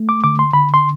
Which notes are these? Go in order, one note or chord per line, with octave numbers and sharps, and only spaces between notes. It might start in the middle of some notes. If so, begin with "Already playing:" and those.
Already playing: A3
D6
D3 D6
C6
D3 B5
C6